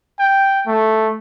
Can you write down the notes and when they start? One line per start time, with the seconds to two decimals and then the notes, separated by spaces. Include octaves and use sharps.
0.19 G5
0.67 A3